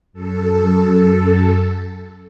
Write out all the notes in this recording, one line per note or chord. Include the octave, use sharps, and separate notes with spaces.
F#2 A4